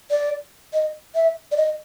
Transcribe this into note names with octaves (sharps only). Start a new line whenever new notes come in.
D5
D#5
E5
D5
D#5